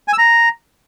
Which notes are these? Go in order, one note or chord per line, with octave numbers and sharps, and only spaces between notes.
G#5
E6
A#5